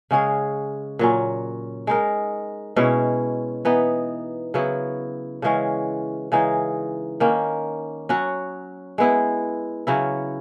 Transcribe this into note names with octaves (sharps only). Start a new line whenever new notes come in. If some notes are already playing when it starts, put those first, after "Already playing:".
C#3 G#3 C#4 G#4
A#2 F#3 C#4
G#3 D#4 A#4
B2 G#3 C#4 E4
E3 B3 D#4
C#3 F#3 B3 E4
C#3 E3 G#3 C#4
C#3 E3 G#3 D#4
D#3 A#3 C#4
F#3 C#4 F#4
G#3 B3 E4
C#3 F#3 C#4 E4